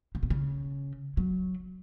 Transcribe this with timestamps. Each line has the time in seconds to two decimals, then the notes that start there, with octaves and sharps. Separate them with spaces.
0.15 C#3
0.23 B2
0.30 C#3
1.17 F#3